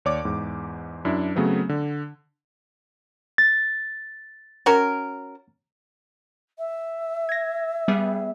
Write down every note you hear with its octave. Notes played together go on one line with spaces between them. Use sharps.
D#2 C#5 D5 D6
E2 G#2
F#2 D4 E4
C#3 F#3 A3 B3 C4
D3
A6
C#4 F#4 A#4
E5
G#6 A#6
G3 B3 G#4